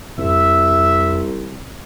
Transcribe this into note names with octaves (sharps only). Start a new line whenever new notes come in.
C2 F2 E5